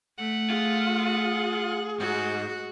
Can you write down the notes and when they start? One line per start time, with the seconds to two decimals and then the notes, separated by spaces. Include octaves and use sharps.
0.19 A3 F#5
0.50 F4 G#4
2.00 G#2 F#4